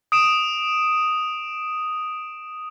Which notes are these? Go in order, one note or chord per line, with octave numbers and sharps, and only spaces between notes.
D#6 D7 E7